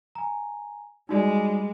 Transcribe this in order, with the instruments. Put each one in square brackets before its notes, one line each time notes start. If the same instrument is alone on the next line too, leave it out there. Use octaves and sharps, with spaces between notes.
[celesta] G#5 A#5
[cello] G3 G#3 [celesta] D#4 F#4 D5